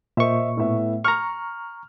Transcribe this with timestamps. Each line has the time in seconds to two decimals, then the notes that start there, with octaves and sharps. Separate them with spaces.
0.17 A#2 C5 D#5 E5 C#6
0.57 A2 B3 E5
1.04 A#5 C#6 F6